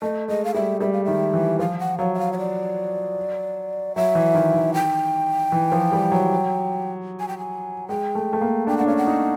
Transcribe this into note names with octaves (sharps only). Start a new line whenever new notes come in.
A3 D#5
G#3 D#5
F5
G3 E5
G3 E5
F5
D#3 E5
E3
F3 F5
F#5
F#3 F5
E5
F5
C#5
D5
F#3 E5
E3
D#3
D#3
G5
E3
F3
G3
F#3
G#5
G5
G#5
G#3 G5
A3
A3
A#3
D4 G5
D4 F#5
C#4 F5
F#5
D#4